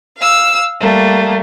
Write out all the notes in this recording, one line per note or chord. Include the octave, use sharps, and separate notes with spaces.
F5 E6
G3 A3 A#3